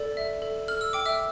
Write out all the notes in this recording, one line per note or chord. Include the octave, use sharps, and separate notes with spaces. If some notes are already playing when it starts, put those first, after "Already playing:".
Already playing: A4 D5
E5
A4
A4 F6
E6
G5 D6
E5 E6